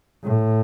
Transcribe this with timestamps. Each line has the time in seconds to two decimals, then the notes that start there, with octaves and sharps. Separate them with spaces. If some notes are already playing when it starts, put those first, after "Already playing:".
0.24 A2